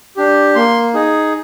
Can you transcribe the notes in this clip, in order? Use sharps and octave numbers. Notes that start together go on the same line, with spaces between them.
D4 G4
A#3 C6
D#4 G#4